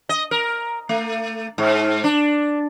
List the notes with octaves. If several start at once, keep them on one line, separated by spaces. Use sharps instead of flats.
D#5
A#4
A3
G#2
D4